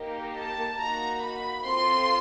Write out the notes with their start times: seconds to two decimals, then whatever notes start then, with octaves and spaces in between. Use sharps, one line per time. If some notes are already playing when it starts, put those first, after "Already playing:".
Already playing: A#3 D#4 G4
0.35 A5
0.78 A#3 D#4 F#4 A#5
1.22 B5
1.65 C4 F4 A4 C6